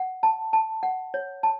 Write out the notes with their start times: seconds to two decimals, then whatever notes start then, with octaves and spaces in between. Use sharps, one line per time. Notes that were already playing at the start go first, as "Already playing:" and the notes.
Already playing: F#5
0.23 A5
0.53 A5
0.83 F#5
1.14 C#5
1.43 A5